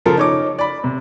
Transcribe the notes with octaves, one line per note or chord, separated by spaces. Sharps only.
C#3 F3 F4 A4 A#4
D#4 C#5 D6
D5 B5
C3